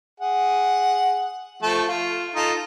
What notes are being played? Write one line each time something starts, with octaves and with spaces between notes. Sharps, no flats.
G#4 F#5
F3 A3 A4
F4
D#4 F4 A4